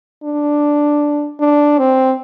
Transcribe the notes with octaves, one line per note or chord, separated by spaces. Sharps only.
D4
D4
C4